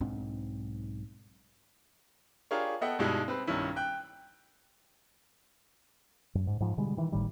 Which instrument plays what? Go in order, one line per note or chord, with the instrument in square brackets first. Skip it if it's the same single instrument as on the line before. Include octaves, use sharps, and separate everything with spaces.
[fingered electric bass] B1 G#2 C4 D4
[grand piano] D4 F4 G4 G#4 A#4 C#5
B3 A4 D#5 E5 F#5 G5
G2 B2 G3 G#3 D#4 E4
C4 B4
B1 G2 D#3 C#4 E4
G5 F#6
[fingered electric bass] F#2
G#2
G#2 F3
B2 D3 G3 G#3
D#3 E3
G#1 A2 D#3 G3